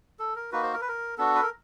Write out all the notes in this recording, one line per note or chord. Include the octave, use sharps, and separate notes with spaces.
A4
A#4
A#3 D#4 F#4 B4
C5
A#4
B4
A#4
B3 D4 F#4 A4
B4
A#4